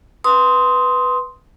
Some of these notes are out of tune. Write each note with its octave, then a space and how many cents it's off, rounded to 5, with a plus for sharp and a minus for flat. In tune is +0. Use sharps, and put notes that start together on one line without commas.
B4 +0 C6 +0 D#6 +15